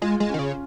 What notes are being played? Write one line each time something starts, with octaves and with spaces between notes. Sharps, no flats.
G#3 F4
G#3
D#3 C#4
C#3